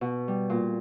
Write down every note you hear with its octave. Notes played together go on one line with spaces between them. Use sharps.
B2
G3
A#2